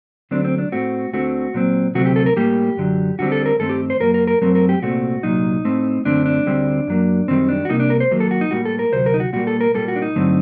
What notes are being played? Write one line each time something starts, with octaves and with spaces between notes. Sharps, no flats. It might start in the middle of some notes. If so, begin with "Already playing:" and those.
D2 D3 F#3 A3 C4 D4
C4
D4
A2 A3 C4 F#4
D2 D3 A3 C4 F#4
A#2 F#3 C4
D2 C3 F#3 A3 C4 F#4
G4
A4
A#4
A2 G3 A#3 G4
F#2 D3 F#3
D#2 D3 G3 C4 F#4
A4
A#4
G2 D#3 A3 C4 A4
G4
C5
F#2 F#3 A#3 A#4
A#4
A#4
F#2 F#3 A3 C4 A#4
A#4
G4
C2 A#2 A3 C4 F#4
C2 A#2 F#3 D#4
A2 A3 C4
F#2 D3 A3 C4 D4
D4
D2 D3 G3 C4
F#2 F#3 A#3
F#2 D#3 G3 C4
D4
F#4
C2 C3 G3 A#3 D#4
D4
A#4
C5
D#2 D#3 F#3 A#3
A4
F#4
D#4
A2 G3 A#3 F#4
A4
A#4
D2 C3 F#3 C5
A#4
D#4
F#4
A#2 G3 A#3 F#4
A4
A#4
A#2 G3 A#3 A4
F#4
D4
D#4
G2 D3 F#3 A3 C4